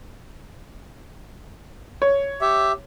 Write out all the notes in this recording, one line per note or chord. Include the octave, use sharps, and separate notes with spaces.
C#5
G4 E5